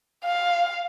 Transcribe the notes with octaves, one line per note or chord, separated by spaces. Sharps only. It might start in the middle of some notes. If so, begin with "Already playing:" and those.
F5